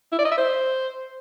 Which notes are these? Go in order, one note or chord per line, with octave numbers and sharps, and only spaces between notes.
E4
D5
D#5
E5
C5